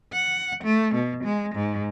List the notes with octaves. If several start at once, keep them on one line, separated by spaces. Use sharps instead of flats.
F#5
A3
B2
G#3
G#2